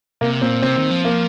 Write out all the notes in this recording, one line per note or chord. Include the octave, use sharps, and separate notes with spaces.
C3 A#3
A#2 C4
C3 C4
D#3
F3
A#3